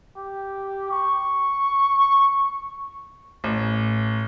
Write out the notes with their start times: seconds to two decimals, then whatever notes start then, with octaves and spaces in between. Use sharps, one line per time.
0.17 G4
0.91 C#6
3.44 A1